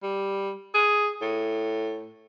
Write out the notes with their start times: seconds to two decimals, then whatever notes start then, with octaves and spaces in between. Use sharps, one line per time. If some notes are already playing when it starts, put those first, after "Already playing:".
0.03 G3
0.74 G#4
1.22 A2